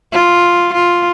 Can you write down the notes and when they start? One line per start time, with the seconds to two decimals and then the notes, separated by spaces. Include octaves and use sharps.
0.13 F4
0.74 F4